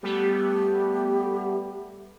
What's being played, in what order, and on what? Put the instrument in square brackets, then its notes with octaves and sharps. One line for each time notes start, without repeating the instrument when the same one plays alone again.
[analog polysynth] G3 A3 B3 [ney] G4